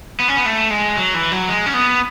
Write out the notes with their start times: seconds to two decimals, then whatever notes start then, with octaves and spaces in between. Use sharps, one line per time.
0.20 B3
0.28 C#4
0.37 B3
0.46 A3
0.70 G#3
0.97 F#3
1.14 E3
1.32 F#3
1.49 G#3
1.66 C#4
1.74 B3